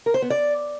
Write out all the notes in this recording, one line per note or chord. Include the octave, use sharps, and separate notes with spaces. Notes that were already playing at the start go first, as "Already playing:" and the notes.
A#4
C5
B3
D5